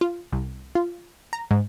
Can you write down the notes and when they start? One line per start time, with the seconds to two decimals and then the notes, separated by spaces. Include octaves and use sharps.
0.01 F4
0.32 C2
0.75 F4
1.33 A#5
1.51 G#2